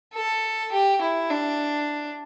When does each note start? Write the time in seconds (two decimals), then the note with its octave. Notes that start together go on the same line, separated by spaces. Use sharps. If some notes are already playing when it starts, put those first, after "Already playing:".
0.14 A4
0.72 G4
1.01 E4
1.30 D4